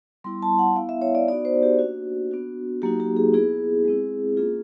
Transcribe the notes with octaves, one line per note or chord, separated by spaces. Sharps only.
G3 B3 E4 C6
A5
F#5
B3 E4 F5
E5
C#5
D5
B3 D#4 F#4 D5
C5
G4
A#3 D4 F#4
B3 D4 F#4
F#3 A#3 D#4 F#4 G4
G4
G#4
B3 E4 G#4
G#3 C4 E4
A#3 C#4 F4 G#4